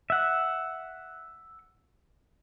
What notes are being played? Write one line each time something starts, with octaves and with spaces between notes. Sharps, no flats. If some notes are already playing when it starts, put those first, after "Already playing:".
E5 F#5